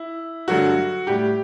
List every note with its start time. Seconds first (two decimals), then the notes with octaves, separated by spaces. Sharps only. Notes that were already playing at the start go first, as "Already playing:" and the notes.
Already playing: E4
0.48 G2 D3 F#3 A3 F#4
1.07 A2 G3 G4